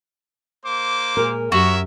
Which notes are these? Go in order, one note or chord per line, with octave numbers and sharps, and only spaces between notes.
A#3 C5 D6
A#2 G#3 A#4
F#2 F#4 G4 A#4 C#5 E5 F#5